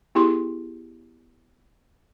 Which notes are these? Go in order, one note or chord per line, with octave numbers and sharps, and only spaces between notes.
B3 E4 G4 G#4 C6